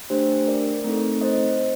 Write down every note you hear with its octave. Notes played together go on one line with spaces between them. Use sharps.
A3 D4 G4 C5
A#4 D5
A3 C4 D#4 A4
C5 D#5